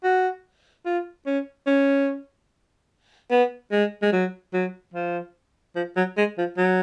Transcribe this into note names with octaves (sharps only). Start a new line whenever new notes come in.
F#4
F4
C#4
C#4
B3
G#3
G#3
F#3
F#3
F3
F3
F#3
G#3
F3
F#3